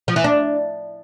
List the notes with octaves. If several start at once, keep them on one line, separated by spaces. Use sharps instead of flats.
F3
E3
D4